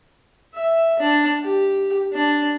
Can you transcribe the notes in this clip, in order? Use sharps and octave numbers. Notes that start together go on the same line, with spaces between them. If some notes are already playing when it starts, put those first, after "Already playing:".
E5
D4
G4
D4